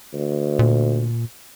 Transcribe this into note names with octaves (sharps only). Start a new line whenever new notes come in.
D2
A#2